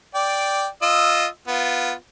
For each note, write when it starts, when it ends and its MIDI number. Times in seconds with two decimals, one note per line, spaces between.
0.15 0.67 74
0.15 0.67 79
0.82 1.26 65
0.82 1.26 75
0.82 1.26 88
1.47 1.92 59
1.47 1.92 65